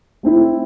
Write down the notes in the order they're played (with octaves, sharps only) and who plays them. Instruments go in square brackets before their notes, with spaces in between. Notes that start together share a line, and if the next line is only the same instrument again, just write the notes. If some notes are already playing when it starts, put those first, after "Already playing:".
[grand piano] A3 C4 E4 A4